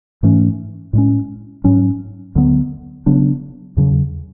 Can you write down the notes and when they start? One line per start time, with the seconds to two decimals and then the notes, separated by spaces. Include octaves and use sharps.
0.23 G#2 E3 A3 C#4
0.93 A2 G#3 C#4
1.64 G#2 F#3 C#4
2.35 D2 D3 F#3 B3
3.06 C#3 F#3 B3 D4
3.77 E2 C#3 F#3